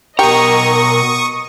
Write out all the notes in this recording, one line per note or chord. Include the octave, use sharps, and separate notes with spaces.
B2 G4 A#4 D#5 A#5 C#6 D#6